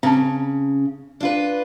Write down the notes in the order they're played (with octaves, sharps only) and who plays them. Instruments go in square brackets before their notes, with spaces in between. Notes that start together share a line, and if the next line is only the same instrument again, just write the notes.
[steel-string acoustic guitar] C#3 [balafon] C4 A5
[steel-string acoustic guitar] D4 F4 B4